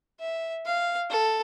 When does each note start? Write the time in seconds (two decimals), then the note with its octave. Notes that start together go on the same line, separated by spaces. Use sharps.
0.20 E5
0.66 F5
1.10 A4